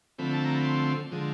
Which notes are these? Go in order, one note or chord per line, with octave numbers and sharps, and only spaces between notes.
D3 F3 A3 C4 B5
A5
A#5
B5
C6
D3 F3 G#3